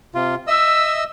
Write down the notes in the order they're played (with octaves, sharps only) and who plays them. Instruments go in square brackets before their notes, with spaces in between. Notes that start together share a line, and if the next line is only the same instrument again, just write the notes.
[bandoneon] C3 F4
[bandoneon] D#5 E6 [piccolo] E5